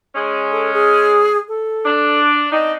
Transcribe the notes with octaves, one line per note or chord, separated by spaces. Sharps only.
G#3 C#4
A4
G#4
A4
D4
C4 D4 D#4 D#5